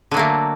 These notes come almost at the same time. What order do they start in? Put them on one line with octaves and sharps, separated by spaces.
D3 F#3 A#3 A3